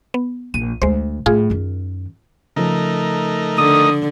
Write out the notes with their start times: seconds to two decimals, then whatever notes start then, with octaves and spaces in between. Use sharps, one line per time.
0.14 B3
0.54 A#1 D#7
0.82 D2 G#3 C5
1.26 A2 F4 G#4
1.50 F#2 D#3
2.56 C#3 F3 A3 D#4 A#4
3.58 D3 D#6